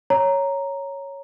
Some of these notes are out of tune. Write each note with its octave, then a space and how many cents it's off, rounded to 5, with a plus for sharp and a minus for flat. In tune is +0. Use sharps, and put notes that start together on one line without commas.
C#5 +0 A#5 +0